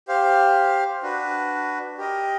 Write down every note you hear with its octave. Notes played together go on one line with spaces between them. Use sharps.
G4 C5 F5
D4 F#4 B4
G4 A#4 D#5